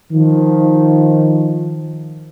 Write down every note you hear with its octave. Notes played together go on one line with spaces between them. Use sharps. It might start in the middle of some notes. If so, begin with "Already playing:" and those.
D#3 F3